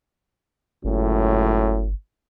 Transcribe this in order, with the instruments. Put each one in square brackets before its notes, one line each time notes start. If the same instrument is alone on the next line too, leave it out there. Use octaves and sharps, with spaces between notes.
[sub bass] G1 [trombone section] C#2 F#2 A2